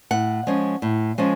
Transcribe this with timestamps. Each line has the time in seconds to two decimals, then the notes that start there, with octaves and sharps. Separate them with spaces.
0.11 A2 F#5
0.47 F3 G#3 C#4
0.82 A2
1.18 F3 G#3 C#4